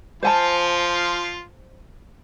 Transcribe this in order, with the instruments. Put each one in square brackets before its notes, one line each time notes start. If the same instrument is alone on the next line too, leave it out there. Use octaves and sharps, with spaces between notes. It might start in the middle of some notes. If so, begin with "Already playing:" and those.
[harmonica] F3 F4 [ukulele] C5 G#5 A5